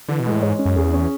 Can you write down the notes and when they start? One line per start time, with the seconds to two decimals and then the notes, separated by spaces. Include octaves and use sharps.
0.08 D3 E3
0.20 B2
0.26 G#3
0.31 A2
0.42 G#2 C#5
0.59 C#4
0.65 F#2
0.76 E2 G#4
0.93 C#4